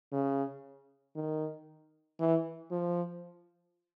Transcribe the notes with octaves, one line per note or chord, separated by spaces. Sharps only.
C#3
D#3
E3
F3